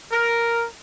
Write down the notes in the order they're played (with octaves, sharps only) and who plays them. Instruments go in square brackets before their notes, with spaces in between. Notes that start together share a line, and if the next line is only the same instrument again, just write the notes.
[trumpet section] A#4